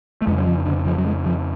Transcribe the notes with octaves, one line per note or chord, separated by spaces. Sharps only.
A3
F2 C#3 G#3
F#3
F3
D3
F3
F#3
G#3
F3